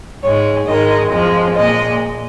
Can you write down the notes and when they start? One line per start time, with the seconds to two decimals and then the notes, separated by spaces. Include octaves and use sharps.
0.23 G#2 G#3 C#5
0.67 G#2 D#3 G#3 D#5
1.12 F2 F3 G#3
1.55 A#2 G#3 D#5